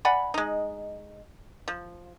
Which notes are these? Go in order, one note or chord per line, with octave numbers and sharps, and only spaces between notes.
D5 F#5 G#5 B5
G#3 D#4
F3